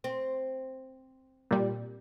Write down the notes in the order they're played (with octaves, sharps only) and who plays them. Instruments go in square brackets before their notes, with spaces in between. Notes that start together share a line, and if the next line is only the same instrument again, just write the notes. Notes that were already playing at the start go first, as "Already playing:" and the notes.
[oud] C4
[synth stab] A#2 G3